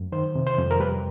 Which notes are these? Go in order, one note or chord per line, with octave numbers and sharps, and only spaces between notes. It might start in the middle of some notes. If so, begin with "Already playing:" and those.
Already playing: F#2
D#3 C5
C3
C5
F2
A#4
G3 B4